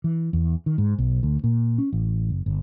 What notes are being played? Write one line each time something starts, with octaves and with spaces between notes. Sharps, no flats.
E3
E2
D#3
G#2
B1
D2
A#2
C#4
A1
F#1
G1